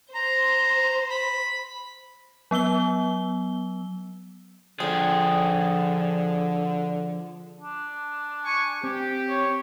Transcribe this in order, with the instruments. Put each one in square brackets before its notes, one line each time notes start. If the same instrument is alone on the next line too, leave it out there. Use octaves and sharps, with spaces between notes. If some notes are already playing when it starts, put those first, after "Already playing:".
[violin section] C5 [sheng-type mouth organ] A#5
[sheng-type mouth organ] B5
[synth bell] F#3 B3 E6 G7
[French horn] D3 [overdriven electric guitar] F3 G#4 [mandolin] G5
[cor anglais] D4
[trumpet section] G#5 C#6
[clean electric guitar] C4 [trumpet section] G4
[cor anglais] C#5